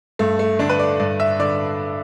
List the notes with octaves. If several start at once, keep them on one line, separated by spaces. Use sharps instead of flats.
G2 A3
A3
D3 D4
B4
D5
G2 D5
E5
D3 D5